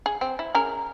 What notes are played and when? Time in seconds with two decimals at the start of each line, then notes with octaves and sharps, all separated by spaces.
0.06 G#4
0.21 C4
0.39 E4
0.55 C#4 G#4 A#4